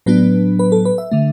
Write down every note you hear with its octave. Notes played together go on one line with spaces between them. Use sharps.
A2 F#3 B3 D4 B4
B4
A4
B4
E5
D3 A3